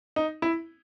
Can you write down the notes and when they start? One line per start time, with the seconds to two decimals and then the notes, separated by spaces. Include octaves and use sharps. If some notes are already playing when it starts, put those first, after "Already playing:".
0.16 D#4
0.42 E4